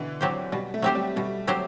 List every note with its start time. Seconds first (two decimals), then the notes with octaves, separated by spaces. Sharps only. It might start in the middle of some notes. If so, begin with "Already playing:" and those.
Already playing: B2 D3 E3
0.21 F#3 C4 G4 C5
0.52 B2 G3
0.74 A3
0.82 F#3 C4 G4 C5
0.95 G3
1.16 B2 G3
1.47 F#3 C4 G4 C5